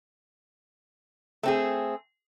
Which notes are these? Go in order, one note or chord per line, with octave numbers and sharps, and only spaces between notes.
A3 C4 G#4